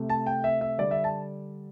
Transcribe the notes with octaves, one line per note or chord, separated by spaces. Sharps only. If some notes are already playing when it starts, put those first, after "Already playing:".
Already playing: C3 A3
A5
G5
E5
E5
D3 G3 D5
E5
A5